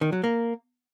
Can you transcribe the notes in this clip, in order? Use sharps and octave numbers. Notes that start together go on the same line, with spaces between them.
D#3
F#3
A#3